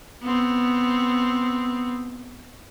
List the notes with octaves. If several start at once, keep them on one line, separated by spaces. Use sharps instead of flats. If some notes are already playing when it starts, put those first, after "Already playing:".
B3 C4